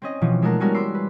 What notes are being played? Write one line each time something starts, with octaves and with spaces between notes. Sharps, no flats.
C4 C#4 D#5
B2 E3 F3
G#3 A3 D4 A#4 F#5
G3 G#3 B3 C#4 F#4 A#4
B5 C6 D6 E6 C7
B4